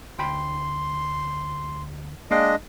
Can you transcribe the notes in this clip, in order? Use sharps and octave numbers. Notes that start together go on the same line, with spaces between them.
D2 G5 B5 C6
G#3 A#3 D4 D#5 F5 G5